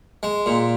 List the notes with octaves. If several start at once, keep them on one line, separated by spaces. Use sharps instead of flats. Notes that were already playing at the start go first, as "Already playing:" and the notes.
G#3
A#2